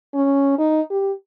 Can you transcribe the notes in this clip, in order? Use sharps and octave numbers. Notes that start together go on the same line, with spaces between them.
C#4
D#4
G4